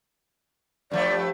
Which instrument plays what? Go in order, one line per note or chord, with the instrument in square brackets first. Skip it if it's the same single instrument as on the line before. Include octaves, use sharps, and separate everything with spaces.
[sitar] G2 F3 A3 [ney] D5